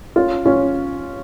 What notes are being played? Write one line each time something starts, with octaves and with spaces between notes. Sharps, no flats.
C#4 F4
C#4 F4